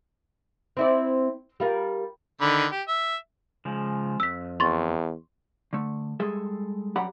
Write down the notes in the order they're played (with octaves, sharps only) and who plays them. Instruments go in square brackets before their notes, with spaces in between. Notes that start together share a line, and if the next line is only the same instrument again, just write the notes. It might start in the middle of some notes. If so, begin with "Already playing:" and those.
[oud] C4 E4 D5
G3 F4 A#4
[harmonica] D3 D#3 B5
G4
E5
[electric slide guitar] C#3 F3 G#3
[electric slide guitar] F2 [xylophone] E6 B6
[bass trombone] E2 [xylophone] C6 C#6 A6
[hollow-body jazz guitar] D3 A3
G3 G#3 G#4 A4 E5
F#2 G4 D5 F#5 A#5 B5